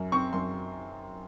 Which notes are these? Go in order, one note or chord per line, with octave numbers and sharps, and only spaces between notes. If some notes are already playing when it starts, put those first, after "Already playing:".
Already playing: F#2
C4 C#6
F#2 C6